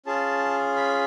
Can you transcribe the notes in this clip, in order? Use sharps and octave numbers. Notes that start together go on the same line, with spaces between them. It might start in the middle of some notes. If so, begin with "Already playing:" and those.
C#4 F4 G#4 A5
B5